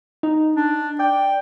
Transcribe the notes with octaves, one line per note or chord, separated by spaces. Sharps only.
D#4
D4
D5 G5